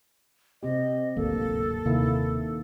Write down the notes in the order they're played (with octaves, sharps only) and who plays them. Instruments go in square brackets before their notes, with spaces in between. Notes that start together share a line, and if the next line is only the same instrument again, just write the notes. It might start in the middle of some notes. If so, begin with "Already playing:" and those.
[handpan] C3 C4 G4 [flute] D#5
[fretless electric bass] D1 G#1 D2 [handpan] A#3 [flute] A4
[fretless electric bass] D#1 C3 [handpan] D#3 A#3 E4